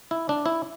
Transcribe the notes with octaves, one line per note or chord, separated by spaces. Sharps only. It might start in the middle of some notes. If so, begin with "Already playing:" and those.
E4
D4
E4